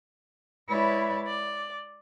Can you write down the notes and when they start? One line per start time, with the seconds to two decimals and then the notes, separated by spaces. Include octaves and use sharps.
0.69 G#3 E4 B4 C#5 D5 E5
1.26 D5